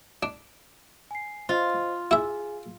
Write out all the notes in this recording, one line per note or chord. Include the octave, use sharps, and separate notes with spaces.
D4
G#5 C7
F4 C5 D#5
E4 G#4 E5 G#5